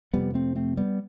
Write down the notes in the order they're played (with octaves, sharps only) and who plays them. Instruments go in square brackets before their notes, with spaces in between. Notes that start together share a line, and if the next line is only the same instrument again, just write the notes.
[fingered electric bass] F2 C3 G3 B3
A3 C4
A3 C4
G3 B3